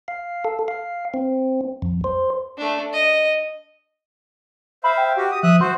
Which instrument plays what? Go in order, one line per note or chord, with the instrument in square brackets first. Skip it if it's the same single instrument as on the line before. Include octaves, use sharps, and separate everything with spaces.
[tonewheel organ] F5
A4
F5
C4
F2
C5
[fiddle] A3 D4
D#5
[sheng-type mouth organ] C5 E5 F5 [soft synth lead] B5
[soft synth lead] G5
[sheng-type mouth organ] F#4 G4
D#6
[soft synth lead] F3 [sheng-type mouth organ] E5 D#6 F#6
[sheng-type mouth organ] F#4 C5 [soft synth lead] C6